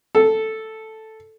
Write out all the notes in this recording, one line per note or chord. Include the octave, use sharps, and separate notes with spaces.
A4